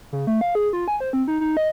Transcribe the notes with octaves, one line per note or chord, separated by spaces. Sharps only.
C#3
A3
F5
G#4
F4
G#5
C5
C4
D#4
D#4
D#5